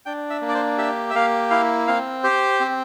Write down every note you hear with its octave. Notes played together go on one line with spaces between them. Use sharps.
D4 G5
E5
A#3
D5
C5
G4 E5
E5
A#3 F5
E4 F5
C4 F5
G4 C5
C4